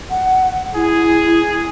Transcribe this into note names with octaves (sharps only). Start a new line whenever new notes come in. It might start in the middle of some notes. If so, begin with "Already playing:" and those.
F#5
E4 G#4